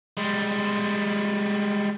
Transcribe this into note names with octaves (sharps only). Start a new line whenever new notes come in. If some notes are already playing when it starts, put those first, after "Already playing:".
G3 G#3